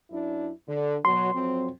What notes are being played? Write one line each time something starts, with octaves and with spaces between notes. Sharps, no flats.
F#2 D4 E4
D3
B2 F#3 C6
F2 F#3 C4